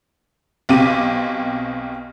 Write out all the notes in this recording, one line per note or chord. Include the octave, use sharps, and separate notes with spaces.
B1 B2 C4 G4 D6 D#7